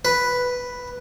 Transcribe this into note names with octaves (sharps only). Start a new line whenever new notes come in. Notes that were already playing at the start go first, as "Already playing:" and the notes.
B4